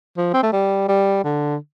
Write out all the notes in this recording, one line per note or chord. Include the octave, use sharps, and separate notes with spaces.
F3
C4
A3
G3
G3
D3